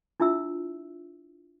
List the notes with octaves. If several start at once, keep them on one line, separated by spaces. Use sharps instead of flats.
D4 E4 F4 E5 E6